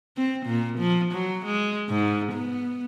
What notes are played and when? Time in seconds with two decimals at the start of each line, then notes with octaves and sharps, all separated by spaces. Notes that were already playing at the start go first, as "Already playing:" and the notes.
0.17 C4
0.46 A#2
0.79 F3
1.12 F#3
1.46 G#3
1.89 G#2
2.33 B3